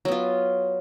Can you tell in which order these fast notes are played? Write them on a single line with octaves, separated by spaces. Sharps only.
F#3 B3 F4